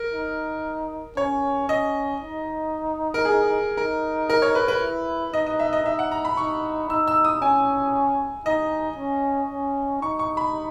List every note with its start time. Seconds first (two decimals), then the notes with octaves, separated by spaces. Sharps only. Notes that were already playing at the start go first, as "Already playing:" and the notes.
Already playing: A#4
0.13 D#4
1.17 C#4 C#5
1.69 C#4 D#5
2.22 D#4
3.14 A#4
3.25 G#4
3.77 D#4 A#4
4.30 A#4
4.42 C#5
4.55 B4
4.68 B4
4.81 E4
5.33 D#4 D#5
5.47 D#5
5.59 E5
5.73 D#5
5.85 D#4 E5
5.99 F#5
6.12 A#5
6.25 B5
6.37 D#4 C#6
6.90 D#4 E6
7.08 E6
7.25 D#6
7.42 C#4 G#5
8.46 D#4 D#5
8.98 C#4
9.50 C#4
10.02 D#4 C#6
10.19 C#6
10.37 B5